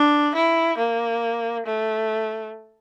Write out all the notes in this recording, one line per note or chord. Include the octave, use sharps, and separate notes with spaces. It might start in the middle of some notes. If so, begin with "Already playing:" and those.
Already playing: D4
E4
A#3
A3